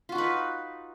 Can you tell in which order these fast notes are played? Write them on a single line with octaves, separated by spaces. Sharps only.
F4 F#4 D#4 B4